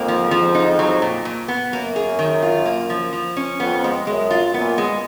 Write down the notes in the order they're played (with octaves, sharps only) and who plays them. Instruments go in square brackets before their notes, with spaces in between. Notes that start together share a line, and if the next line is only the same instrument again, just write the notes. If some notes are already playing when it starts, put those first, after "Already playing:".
Already playing: [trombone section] F2 G#2 [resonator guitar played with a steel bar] A#3
[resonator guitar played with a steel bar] F3
F3
D#4
F#3
A#2
A#2
B3
[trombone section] F#2 [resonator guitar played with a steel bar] A#3
[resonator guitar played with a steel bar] G#4
D#3
F4
A#3
F3
F3
C#4
[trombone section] F2 [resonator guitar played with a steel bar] B3
[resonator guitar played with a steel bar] G#3
[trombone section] F#2 [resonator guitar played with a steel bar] G#3
[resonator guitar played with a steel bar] F4
[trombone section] F#2 A#2 [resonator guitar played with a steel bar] B3
[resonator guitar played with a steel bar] G#3